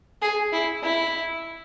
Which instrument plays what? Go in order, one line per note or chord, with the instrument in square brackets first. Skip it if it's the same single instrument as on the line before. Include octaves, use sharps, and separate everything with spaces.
[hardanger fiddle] G#4
E4
E4